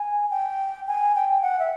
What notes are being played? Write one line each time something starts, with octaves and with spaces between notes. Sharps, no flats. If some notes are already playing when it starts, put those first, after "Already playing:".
Already playing: G#5
G5
G#5
G5
F#5
E5